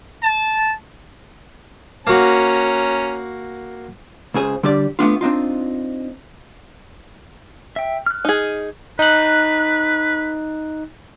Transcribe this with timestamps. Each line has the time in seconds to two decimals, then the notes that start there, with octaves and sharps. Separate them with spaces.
0.22 A5
2.07 A#3 C#4 F#4 A#5
4.34 C#2 C#3 G#4 C5
4.63 D3 G3 D4 G4 D5
4.99 A3 B3 D4 F4
5.21 C4 D4 D#4 F4
7.76 E5 G5
8.06 F6 F#6
8.25 D#4 G#4
8.99 D#4 B4 F#6